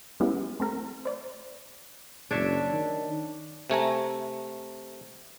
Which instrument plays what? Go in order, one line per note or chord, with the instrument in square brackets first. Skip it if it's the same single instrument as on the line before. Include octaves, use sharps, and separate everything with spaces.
[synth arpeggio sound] G3 G#3 B3 C#4 E4
A3 C4 A#4
C5 D5
[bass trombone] F#1 [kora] D4 C#5 E5
[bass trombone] D#3
[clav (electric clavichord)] C3 A3 G#5 A#5